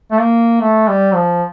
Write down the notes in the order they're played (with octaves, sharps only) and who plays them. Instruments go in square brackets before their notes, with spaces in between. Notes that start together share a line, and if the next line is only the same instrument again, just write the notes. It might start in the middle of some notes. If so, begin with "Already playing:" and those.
[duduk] A3
A#3
A3
G3
F3